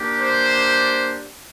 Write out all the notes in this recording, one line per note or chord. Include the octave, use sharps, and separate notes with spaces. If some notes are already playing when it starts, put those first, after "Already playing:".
Already playing: A#3 D4 G4
C5